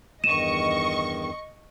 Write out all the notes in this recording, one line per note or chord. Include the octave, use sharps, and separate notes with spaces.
E2 G2 D#3 D#5 C#6 D#7 E7